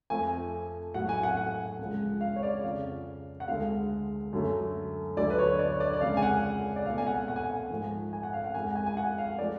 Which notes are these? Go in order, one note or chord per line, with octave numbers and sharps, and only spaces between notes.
F2 F3 A3 G#5
A2 F#3 A3 F#5
G#5
F#5
F#5
C#2 C#3 F3 G#3
F5
C#5
D5
F2 C#3 F3 F5
F#5
D2 D3 G#3 F5
F#2 D3 F#3 A3
D2 D3 F#3 A3 D5
B4
C#5
D5
C#5
D5
D5
F2 C#3 G#3 F5
G#5
F#5
D5
C#2 B2 A3 F5
G#5
F#5
F#5
G#5
F#5
G#2 F3 A3
G#5
F#5
F5
F#5
F2 F3 G#3 G#5
F#5
G#5
G#5
F#5
F5
F3 A3 D5